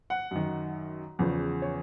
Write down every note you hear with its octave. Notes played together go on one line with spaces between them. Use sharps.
F#5
F#2 D#3
E2 C#3 F3
C#5